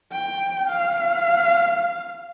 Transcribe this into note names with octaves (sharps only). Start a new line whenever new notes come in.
G5
F5